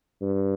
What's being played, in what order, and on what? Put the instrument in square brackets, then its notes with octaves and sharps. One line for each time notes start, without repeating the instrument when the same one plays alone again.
[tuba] G2